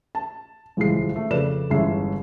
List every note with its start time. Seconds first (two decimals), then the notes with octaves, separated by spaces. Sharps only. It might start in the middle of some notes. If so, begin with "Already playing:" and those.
0.15 A5
0.77 D#1 C#2 E3 G#3 C7
1.16 A3
1.30 F2 C#3 A4 B4 D5 E7
1.70 G1 E2 G#3 C#4 E5 C7